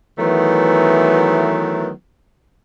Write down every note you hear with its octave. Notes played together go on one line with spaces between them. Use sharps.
D#3 E3 F#3 A3 B3